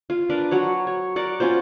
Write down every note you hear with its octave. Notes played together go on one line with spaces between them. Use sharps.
F4
D4 A#4 B4
F#3 F#4 C#5
C#5
A#4 D5 F#5
C#4 F4 F#4 C5